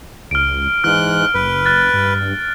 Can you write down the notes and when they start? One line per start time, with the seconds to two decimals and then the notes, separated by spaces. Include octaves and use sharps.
0.31 C#2 F6 D7
0.84 G#2 E3 F6 F#6
1.35 F#1 B4
1.66 F#6 A6
1.94 G2